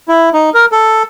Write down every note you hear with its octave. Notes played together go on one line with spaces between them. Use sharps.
E4
D#4
A#4
A4